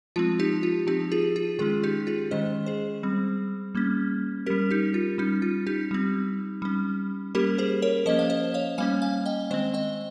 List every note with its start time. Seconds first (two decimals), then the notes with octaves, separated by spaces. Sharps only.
0.16 F3 G#3 C4 F4
0.39 D#4 G4
0.63 F4
0.87 F3 C4 D#4 G4
1.12 F4 G#4
1.36 F4 G#4
1.59 D#3 G#3 C#4 F4 G#4
1.83 D#4 G4
2.07 F4 G#4
2.31 D#3 G#3 C#4 C5 D#5
2.66 G#4 C5
3.03 G3 C4
3.75 G3 A#3 C#4
4.46 G3 C#4 G4 A#4
4.71 D#4 G4
4.94 F4
5.18 G3 C#4 D#4
5.42 F4
5.67 D#4 G4
5.91 G3 C4
6.62 G3 C#4
7.35 G3 A#3 C#4 G4 A#4
7.58 G#4 C5
7.82 A#4 C#5
8.06 F3 A#3 C#4 C5 D#5
8.19 F5
8.30 C5 D#5
8.54 C#5 F5
8.78 G3 A#3 C#4 F5 G#5
9.02 F5 G#5
9.26 D#5 G5
9.51 D#3 G#3 C4 C5 D#5
9.74 D#5 G5